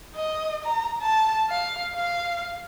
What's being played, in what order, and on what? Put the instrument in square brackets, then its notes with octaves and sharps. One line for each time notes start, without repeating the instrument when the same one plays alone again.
[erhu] D#5
A#5
A5
F5
F5